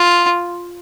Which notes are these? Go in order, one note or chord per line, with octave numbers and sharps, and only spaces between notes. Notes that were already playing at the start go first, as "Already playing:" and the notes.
Already playing: F4